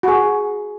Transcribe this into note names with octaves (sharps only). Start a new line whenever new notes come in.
F#4
G#4